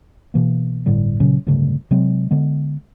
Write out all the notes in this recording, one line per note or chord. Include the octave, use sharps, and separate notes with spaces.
B2 E3 A#3
G1 A2 D3 G3
A#2 C#3 F#3 C#4
D1 D2 G2 C#3
C3 F#3 G#3 C4
D3 G#3 B3